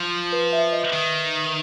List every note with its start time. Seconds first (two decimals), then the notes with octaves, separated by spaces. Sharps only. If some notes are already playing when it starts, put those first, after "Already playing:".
Already playing: F3
0.32 B4
0.53 E5
0.73 D#5
0.93 D#3